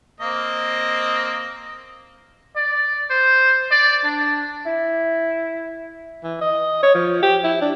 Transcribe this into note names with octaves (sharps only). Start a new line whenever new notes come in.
A#3 C4 D#5
D5
C5
D5
D4
E4
E3
D#5
C#5
F3
G4
E4
D4